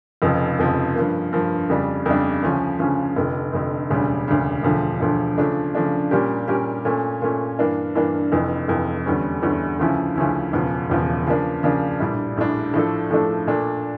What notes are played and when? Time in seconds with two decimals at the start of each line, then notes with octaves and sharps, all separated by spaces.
0.22 F1 F2 C#3 F3
0.59 F1 F2 C#3 F3
0.95 G2 F3 A#3
1.33 G2 F3 A#3
1.70 F2 C#3 G3 D4
2.06 F2 C#3 G3 D4
2.43 D2 C#3 F3 C#4
2.79 D2 C#3 F3 C#4
3.16 F1 F2 D3
3.53 F1 F2 D3
3.90 E1 D2 C#3 G3
4.27 E1 D2 C#3 G3
4.63 E1 D2 D3 F3
5.00 E1 D2 D3 F3
5.38 C#3 F3 A3 D4
5.75 C#3 F3 A3 D4
6.11 A#2 G3 C#4 G4 A#4
6.47 A#2 G3 C#4 G4 A#4
6.85 A#2 A3 C#4
7.22 A#2 A3 C#4
7.59 G2 E3 A#3 D4
7.95 G2 E3 A#3 D4
8.32 F1 F2 E3
8.68 F1 F2 E3
9.06 E2 D3 G3 C#4
9.42 E2 D3 G3 C#4
9.79 D2 C#3 F3 C#4 E4
10.16 D2 C#3 F3 C#4 E4
10.53 E1 E2 C#3 F3
10.90 E1 E2 C#3 F3
11.26 C#3 F3 A#3 D4
11.63 C#3 F3 A#3 D4
12.00 A#1 A2 G3 D4
12.37 A#1 A2 G3 D4
12.74 A2 F3 A3 D4 A4
13.11 A2 F3 A3 D4 A4
13.47 A#2 A3 D4